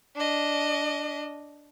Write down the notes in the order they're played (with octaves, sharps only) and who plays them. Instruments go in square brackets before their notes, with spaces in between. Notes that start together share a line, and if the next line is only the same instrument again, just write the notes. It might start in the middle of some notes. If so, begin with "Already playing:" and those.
[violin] D4 D#5